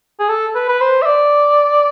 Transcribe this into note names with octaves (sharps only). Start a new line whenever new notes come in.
G#4
A4
B4
B4
C5
E5
D5